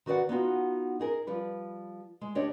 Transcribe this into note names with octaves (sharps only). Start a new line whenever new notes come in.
D#3 F#4 B4 D5 F#5
B3 D#4 F4 F#4
D#4 G#4 A#4
F3 G3 B4
G#3
D2 D4 G4 C#5 D#5